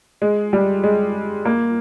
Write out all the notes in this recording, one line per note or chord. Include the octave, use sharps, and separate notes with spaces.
G#3
G3
G#3
A#3